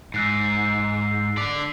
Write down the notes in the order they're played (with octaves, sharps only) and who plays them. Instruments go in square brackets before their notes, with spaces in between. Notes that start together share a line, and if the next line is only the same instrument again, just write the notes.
[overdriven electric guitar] G#2 [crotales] E6 F#6 C7
[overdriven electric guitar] D3 D5 [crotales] B6 F7